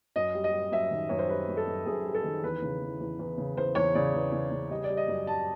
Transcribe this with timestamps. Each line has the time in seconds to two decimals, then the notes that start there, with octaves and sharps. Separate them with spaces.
0.16 F#2 D#5
0.34 G3
0.44 D#5
0.53 G3
0.72 F#2 E5
0.91 D#3
1.09 F#2 C#5
1.19 C5
1.29 G3 B4
1.48 F#2
1.57 A4
1.67 F#2
1.86 F#2 G#4
2.06 G3
2.15 A4
2.24 D#3
2.43 E2 B4
2.62 C#3
2.82 E3
3.00 E2
3.19 E2
3.38 C#3
3.57 E2 C5
3.75 E2 C#5
3.95 C#3 D5
4.14 E2
4.32 C#3
4.51 C#3
4.70 G3 D#5
4.84 D5
4.90 G3
4.97 D#5
5.08 F#2
5.27 G3 A5